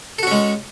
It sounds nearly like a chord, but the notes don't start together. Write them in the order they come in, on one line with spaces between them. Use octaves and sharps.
A4 F#4 C#4 G#3